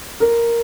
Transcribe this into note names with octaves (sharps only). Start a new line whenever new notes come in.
A#4